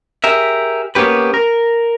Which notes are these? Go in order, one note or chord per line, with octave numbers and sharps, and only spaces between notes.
G4 G#4 A#4 E5
A#3 B3 C#4 G4 B4
A#4